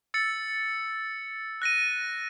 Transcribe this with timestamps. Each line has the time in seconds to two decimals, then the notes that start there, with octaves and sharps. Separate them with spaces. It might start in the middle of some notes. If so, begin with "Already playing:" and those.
0.14 E6 A6 C#7
1.62 F#6 A#6 D#7